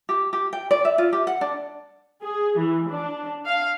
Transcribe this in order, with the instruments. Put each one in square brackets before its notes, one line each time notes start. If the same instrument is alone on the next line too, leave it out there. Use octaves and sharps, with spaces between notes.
[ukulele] G4
G4
G5
D5
E5
F4
G4
F#5
D4
[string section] G#4
E3
D4
F5